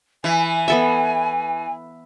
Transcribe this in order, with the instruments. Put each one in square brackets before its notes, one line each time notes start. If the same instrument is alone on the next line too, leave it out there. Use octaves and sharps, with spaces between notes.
[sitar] E3 [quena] G#5
[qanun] B3 A4 E5